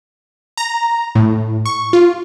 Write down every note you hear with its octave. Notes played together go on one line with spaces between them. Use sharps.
A#5
A2
C#6
F4